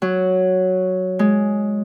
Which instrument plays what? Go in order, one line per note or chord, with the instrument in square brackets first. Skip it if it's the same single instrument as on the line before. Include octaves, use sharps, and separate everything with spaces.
[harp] F#3
G#3